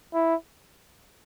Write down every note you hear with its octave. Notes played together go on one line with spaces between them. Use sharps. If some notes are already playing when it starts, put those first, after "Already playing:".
E4